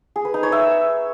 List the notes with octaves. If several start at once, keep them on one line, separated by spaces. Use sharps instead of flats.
G#4
B4
D#4
C#5
E5